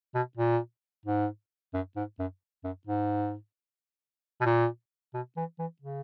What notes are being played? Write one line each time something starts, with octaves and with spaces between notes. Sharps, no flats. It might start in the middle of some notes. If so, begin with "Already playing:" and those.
B2
A#2
G#2
F#2
G#2
F#2
F#2
G#2
B2
A#2
B2
E3
E3
C#3